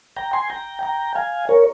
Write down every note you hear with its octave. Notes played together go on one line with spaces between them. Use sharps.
G5 A#5
G#5 C6
G5 A#5
G5 A#5
F5 G#5
A#4 C#5